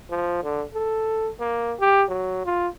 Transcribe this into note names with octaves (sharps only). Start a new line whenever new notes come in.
F3
D3
A4
A#3
G4
F#3
F4